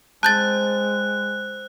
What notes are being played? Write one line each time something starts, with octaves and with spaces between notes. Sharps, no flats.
G#3 C4 A5 F#6 G6 A6